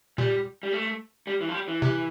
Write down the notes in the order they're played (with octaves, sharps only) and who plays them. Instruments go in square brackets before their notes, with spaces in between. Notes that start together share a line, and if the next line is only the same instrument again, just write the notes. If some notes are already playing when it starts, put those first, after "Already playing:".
[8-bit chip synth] A#2 [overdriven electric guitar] G3
[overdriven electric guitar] G3
A3
G3
E3
F3
G3
E3
[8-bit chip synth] C3